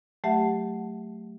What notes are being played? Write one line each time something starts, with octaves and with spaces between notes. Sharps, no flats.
F#3 A3 G4 E5 F#5 A5